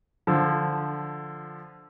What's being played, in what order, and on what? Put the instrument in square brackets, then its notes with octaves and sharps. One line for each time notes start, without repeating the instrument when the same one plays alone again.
[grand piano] D3 F3